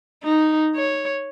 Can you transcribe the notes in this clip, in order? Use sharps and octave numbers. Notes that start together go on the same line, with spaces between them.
D#4
C#5